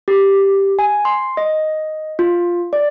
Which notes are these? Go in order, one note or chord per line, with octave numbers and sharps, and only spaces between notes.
G4
G#5
C6
D#5
F4
D5